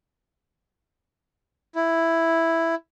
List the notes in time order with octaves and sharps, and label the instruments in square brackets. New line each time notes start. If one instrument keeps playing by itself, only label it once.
[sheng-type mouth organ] E4